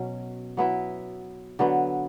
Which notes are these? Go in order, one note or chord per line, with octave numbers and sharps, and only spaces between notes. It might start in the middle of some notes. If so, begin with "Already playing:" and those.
Already playing: B2 F#3 C#4 F#4
F#3 B3 E4
D3 F#3 B3